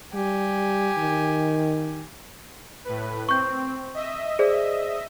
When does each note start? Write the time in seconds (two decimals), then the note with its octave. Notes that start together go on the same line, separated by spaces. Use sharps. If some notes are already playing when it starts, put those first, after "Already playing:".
0.14 G3 G4 G#5
0.98 D#3
2.85 A2 B4
3.29 C4 C#6 G6
3.94 D#5 E5
4.39 G#4 C5 D5